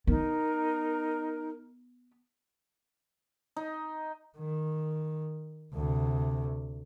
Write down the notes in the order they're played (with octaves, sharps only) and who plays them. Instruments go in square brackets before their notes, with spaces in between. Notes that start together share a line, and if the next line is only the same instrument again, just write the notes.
[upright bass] B3 [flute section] D#4 A#4
[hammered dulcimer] D#4
[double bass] D#3
D2 C3